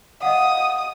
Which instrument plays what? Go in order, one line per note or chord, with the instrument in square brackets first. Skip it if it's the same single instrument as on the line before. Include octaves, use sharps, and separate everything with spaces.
[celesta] D#5 F5 F#5 [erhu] D#6